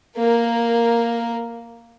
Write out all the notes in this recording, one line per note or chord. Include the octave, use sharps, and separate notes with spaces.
A#3 A#4